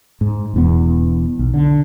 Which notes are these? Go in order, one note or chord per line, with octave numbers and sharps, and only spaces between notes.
G#2
E1 E2 B3
B1
D3